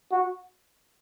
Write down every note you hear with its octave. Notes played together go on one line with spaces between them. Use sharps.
F#4